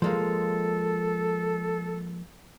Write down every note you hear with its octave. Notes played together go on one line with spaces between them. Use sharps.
F3 G#3 A#3 A4